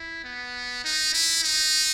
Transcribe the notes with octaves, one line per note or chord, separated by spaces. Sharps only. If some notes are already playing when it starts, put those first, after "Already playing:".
Already playing: E4
B3
D#4
E4
D#4